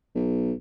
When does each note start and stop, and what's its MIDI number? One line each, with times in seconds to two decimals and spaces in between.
0.15 0.52 35